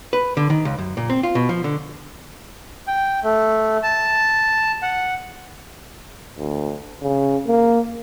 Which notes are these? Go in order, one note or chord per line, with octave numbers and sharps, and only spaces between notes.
B4
D3
D#3
C#2
F#2
A#2
C4
F4
B2
F3
D3
G5
A3
A5
F#5
D2
C#3
A#3